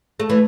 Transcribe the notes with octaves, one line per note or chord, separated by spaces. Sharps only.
A3
E3